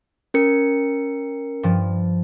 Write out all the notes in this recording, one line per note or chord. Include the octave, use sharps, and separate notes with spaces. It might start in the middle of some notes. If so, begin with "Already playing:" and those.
C#4 A#4 G#6 C#7
G2 F3